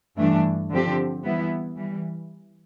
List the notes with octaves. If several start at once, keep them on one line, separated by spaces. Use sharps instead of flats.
G2 E3 A3 D4
D3 F3 C4 G4
E3 G3 B3 E4
E3 G3